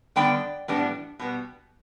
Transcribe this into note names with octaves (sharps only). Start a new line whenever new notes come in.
D3 G3 B3 D4 D5 G5
A2 E3 G3 B3 D4
B2 G3 B3